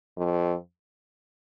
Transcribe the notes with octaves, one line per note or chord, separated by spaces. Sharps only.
F2